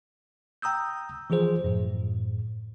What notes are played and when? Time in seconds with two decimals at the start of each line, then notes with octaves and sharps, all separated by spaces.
0.62 G5 A#5 D#6 E6 G6
1.30 E3 F3 F4 G#4 C5
1.64 F#2 A2